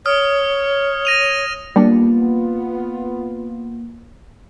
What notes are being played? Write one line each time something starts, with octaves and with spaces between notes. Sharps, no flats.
C#5 D#6 F6
A#6 D#7 F7
G3 A#3 B3 D4 F4